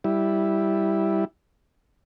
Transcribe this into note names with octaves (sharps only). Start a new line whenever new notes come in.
G3 E4